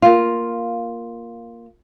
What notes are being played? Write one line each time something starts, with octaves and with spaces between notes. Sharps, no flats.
A#3 F4